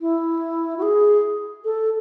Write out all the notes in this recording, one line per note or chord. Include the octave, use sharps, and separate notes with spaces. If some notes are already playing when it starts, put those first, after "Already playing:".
E4
F#4
G#4
A4